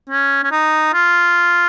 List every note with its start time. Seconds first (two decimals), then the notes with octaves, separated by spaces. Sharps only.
0.09 C#4
0.44 C#4
0.51 D#4
0.93 F4